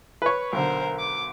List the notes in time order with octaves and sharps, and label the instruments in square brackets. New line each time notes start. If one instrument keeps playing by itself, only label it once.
[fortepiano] B4 C#5
[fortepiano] B1 D3 [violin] A#4 C5
[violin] D6